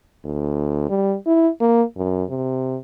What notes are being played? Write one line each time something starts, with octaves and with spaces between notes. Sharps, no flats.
D2
G3
E4
A#3
F#2
C3